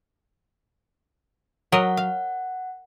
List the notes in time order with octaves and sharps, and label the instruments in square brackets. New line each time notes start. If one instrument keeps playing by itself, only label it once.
[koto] F#3 A#4 D#5 [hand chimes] F#5
[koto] F5